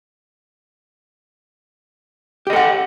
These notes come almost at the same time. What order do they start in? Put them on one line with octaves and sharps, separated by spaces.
G4 D#5 A4 F#5